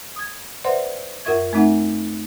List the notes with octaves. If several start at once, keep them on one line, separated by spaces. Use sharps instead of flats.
D#6 G#6
B4 C5 D5 E5 F#5 C6
F#2 F4 A#4 E5 C#6 G#6
A3 C4 D#4 E5 F#5